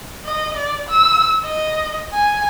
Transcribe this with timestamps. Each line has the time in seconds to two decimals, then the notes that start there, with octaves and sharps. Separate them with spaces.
0.25 D#5
0.57 D5
0.89 E6
1.44 D#5
2.13 G#5